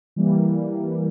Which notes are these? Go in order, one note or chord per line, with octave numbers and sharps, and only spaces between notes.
E3 G3 A#3